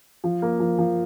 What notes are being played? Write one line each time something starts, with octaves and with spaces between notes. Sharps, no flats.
F3
A#3
F3
F3